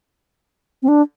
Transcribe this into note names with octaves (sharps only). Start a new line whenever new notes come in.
C4
D4